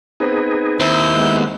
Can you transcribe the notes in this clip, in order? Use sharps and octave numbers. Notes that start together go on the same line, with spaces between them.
B3 C4 D#4 G#4
D#2 C4 E4 G6
G#3 B3